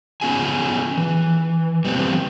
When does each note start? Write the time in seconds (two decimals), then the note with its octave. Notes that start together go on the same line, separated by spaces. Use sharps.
0.21 B3 C#4 F4 G#4 G#5
0.97 E3
1.85 G3 B3 C4